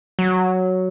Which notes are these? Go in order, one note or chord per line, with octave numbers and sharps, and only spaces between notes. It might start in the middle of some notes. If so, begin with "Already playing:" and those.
F#3